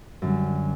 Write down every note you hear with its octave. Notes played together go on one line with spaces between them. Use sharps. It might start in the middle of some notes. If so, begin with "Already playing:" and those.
F#2 D3 G3